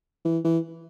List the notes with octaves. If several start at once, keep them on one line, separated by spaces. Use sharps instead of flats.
E3
E3